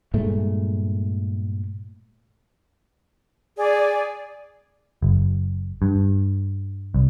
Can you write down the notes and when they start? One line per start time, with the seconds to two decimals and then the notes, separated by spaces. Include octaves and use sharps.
0.14 G2 A#2 G#3 A3
3.57 G#4 D5
5.02 F#1
5.82 G2
6.94 C2